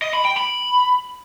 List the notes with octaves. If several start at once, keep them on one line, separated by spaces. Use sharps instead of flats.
D#5
B5
G5
B5